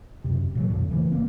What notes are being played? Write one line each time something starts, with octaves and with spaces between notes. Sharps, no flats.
F#2 C3
A#2 E3 F#3
F2 A#2 D3
C#3 E3 A3
G1 A#3 C4